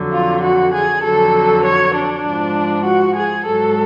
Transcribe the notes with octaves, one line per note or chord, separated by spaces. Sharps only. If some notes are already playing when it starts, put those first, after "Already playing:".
Already playing: F2 D3 F#3
F4
F#4
G#4
F2 D3 F#3 A4
C#5
D4
G#2 F3
F#4
G#4
G#2 F#3 A4